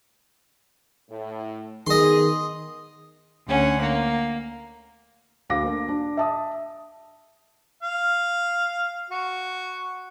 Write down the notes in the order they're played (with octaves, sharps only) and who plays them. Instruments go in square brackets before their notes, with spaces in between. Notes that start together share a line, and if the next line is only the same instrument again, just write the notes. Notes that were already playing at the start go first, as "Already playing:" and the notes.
[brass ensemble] A2
[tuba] D#3 [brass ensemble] B3 G#4 [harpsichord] D#5 C6
[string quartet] D2 C#4 F#5
A#3
[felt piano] D2 F5 D6 A#6
A#3 D4
D4
E5 A5 D#6
[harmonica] F5
F#4